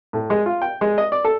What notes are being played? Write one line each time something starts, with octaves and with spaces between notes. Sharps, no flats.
A2
G#3
F4
G5
G#3
D#5
D5
A4